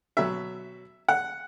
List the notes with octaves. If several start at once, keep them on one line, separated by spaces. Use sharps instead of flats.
B2 F#3 E5
F#5